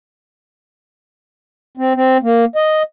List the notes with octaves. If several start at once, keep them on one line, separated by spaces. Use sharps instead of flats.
C4
C4
A#3
D#5